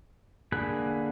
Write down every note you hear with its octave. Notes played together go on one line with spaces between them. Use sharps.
D3 A#3 G#4 B5 F#6